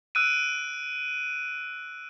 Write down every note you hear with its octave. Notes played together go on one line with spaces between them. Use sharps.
E6 F#6 D7 D#7